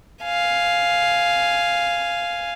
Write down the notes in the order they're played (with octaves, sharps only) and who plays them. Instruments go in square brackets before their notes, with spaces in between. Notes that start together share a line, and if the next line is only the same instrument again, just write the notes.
[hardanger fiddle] F5 G#5